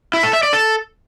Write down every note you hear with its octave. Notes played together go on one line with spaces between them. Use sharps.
E4
A4
E5
D5
A4